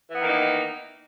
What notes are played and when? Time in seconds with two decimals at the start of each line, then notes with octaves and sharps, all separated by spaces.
0.10 E3
0.15 B3
0.20 D#3
0.25 A#3
0.29 D#4